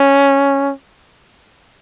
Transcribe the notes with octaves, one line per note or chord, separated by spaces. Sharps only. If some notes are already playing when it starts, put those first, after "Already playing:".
Already playing: C#4